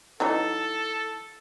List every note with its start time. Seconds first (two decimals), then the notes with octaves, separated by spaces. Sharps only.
0.20 E3 F#3 D#4 A4